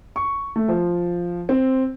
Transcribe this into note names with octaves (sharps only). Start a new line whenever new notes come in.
C#6
A3
F3
C4